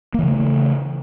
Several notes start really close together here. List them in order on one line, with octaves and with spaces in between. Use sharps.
A#3 E3 C#3 A3